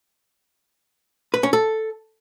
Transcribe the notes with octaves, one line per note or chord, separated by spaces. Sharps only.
B4
C#4
A4